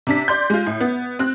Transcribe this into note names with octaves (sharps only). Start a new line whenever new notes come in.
C3 D4 B6
D5 C6 G6
G#3 F4
A2
B3
C4 F#6